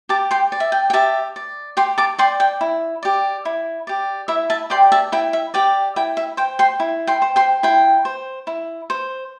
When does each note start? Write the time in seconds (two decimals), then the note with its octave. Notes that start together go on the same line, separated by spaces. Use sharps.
0.09 G4 A5 D6
0.31 G5 C6
0.52 D5
0.60 E5
0.72 G5
0.90 G5
0.93 G4 E5 A5
1.36 D5
1.77 G4 G5 C6
1.98 A5 D6
2.18 D5 G5 C6
2.40 G5
2.61 E4
3.03 G4 D5
3.45 E4
3.87 G4 D5
4.28 E4 E5
4.50 E5 A5
4.70 G4 D5 G5 C6
4.92 E5 A5
5.12 E4 G5
5.33 E5
5.54 G4 D5 G5
5.96 E4 G5
6.17 E5
6.37 C5 G5
6.59 G5 C6
6.80 E4
7.07 G5 C6
7.22 C5
7.36 G5 C6
7.63 E4 G5 C6
8.05 C5
8.47 E4
8.90 C5